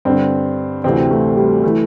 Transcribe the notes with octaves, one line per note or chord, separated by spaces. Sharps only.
G2 D3 C4
D2 C3 E3 C4
A3
G3
E3 A3